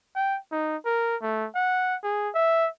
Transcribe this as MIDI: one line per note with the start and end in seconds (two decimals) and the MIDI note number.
0.15 0.38 79
0.52 0.76 63
0.86 1.16 70
1.22 1.47 57
1.55 1.96 78
2.03 2.29 68
2.34 2.68 76